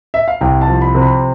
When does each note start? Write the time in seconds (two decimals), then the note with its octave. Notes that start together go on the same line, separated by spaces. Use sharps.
0.14 E5
0.28 F5
0.41 C2 G5
0.61 A5
0.68 F3
0.82 B5
0.95 C3
1.02 B5